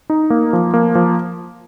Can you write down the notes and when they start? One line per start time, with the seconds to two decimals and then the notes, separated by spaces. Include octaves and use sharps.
0.10 D#4
0.30 A#3
0.53 F3
0.74 A#3
0.95 F3